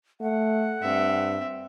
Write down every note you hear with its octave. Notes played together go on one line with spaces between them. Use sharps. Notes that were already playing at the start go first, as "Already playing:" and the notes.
A3 F#5
G2 C4 E5